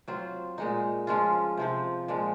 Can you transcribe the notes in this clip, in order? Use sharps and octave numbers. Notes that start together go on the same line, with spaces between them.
F#3 C4 F4
A#2 G#3 D#4
F3 G#3 C#4 F4
C3 F3 C4
A#2 F3 G#3